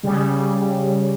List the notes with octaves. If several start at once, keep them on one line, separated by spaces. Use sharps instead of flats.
C#3 G3